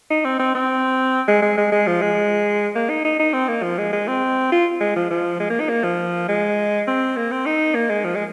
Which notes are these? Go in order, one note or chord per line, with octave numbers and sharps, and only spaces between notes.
D#4
C4
C4
C4
G#3
G#3
G#3
G#3
F3
G#3
A#3
D#4
D#4
D#4
C4
A#3
F3
G#3
G#3
C4
F4
G#3
F3
F3
G#3
A#3
D#4
A#3
F3
G#3
C4
A#3
C4
D#4
A#3
G#3
F3
G#3